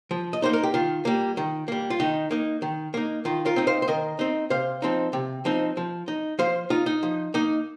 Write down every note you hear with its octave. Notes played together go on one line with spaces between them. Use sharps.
F3
D#5
A#3 D#4 C5
A#4
G4
D#3 F4
G3 A#3
D#3
G3 A#3
F4
D#3 D#4
A#3 D#4
D#3
A#3 D#4
D#3 F4
F4 A#4
C4 D#4
C5 F5
C5
D#3 A#4 D#5
C4 D#4
C3 C5 F5
F3 C4 D#4
C3
F3 C4 D#4
F3
D#4
F3 C5 F5
D#4 F4
D#4
F3
A#3 D#4